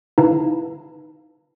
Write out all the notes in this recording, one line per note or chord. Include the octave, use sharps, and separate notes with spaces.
D#4 E4 B4 F5 A5 A#5